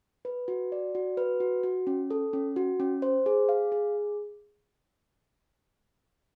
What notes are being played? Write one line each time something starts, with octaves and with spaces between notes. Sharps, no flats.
B4
F#4
D5
F#4
B4
F#4
F#4
C#4
A4
C#4
F#4
C#4
C5
G#4
F5
G#4